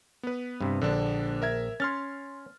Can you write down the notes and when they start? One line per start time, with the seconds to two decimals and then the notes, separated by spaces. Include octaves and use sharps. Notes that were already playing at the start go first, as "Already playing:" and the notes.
0.23 B3 B4
0.61 G2 C3
0.82 A#1 D3 D4
1.42 A#4 E5 G#6
1.80 C#4 C6 F6 A6